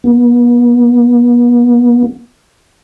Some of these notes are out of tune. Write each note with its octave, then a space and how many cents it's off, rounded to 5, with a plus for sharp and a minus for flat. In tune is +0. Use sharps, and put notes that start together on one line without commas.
B3 -40